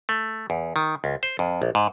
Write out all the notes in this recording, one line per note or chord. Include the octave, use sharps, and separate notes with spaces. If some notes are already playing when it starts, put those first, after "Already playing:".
A3
E2
D#3
C#2
C5
F2
A#1
G#2